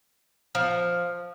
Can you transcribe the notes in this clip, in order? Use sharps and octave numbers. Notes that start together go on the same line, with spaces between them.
F3